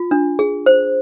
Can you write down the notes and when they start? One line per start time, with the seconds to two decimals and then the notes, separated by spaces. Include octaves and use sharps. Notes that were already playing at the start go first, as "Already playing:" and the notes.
Already playing: F4
0.11 D4
0.39 G#4
0.66 C5